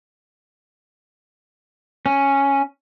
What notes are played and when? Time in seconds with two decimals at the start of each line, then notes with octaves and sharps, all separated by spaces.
2.06 C#4